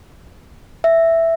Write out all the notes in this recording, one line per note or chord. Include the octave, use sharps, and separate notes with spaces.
E5